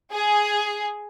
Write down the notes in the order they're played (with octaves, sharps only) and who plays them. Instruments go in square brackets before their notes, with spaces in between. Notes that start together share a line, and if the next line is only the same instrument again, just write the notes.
[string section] G#4